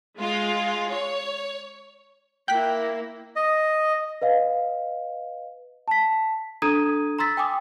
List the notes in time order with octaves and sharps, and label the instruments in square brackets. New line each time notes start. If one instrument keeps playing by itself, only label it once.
[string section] G#3 F4
C#5
[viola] A#3 E4 [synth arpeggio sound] G5 F#6 B6
[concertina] D#5
[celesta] B4 D#5 F5
A5 B6
D4 A4 A#5 D#6 G#6 D#7
A#5 C6 E6 A6 B6
G5 G#5 D6 D#6